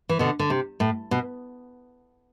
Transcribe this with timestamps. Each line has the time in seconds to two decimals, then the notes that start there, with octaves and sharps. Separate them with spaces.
0.09 E3
0.19 B2 D3
0.39 D3
0.50 C3
0.80 A2
1.11 B2